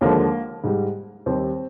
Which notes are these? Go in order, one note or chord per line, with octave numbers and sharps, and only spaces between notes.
D#2 D3 F3 G#3 A#3
G#2 G3
D#2 D#3 G3 C4